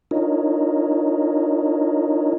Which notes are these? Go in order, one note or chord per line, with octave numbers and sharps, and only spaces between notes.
D4 D#4 F4 A#4 C#5 D#5